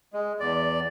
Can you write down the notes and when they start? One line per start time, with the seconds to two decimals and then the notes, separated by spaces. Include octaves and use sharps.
0.13 G#3
0.40 E2 D5